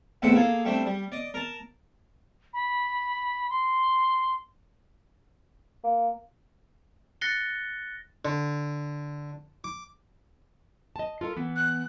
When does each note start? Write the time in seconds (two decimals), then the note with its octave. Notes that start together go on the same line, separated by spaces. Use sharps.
0.22 E2 A2 B3 C4 A4 F#5
0.35 A#3 G#4 A4
0.65 G3 A3 C4 D4
0.86 G3
1.12 D5 D#5
1.34 A#4 A5
2.53 B5
3.50 C6
5.84 A#3
7.21 F#6 A6 A#6 C7 C#7 G7
8.25 D3
9.64 D6
10.96 D#5 A5
11.21 F4 A4 A#4
11.37 E3 B3
11.56 F#6